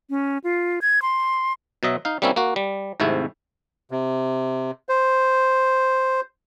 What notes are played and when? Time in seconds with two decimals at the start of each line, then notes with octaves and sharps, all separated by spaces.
0.10 C#4
0.44 F4
0.82 G#6
1.02 C6
1.83 B2 F#3 D#5 E5
2.05 D#4 F5
2.22 G3 A#3 C4 C#4 E4
2.36 A#3 F#4
2.56 G3
3.00 G#1 G#2 C3 A3 E4
3.91 C3
4.89 C5